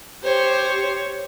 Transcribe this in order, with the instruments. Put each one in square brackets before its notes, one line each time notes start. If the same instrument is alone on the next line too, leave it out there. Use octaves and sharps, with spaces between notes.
[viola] G4 [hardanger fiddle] C5 [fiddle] C#5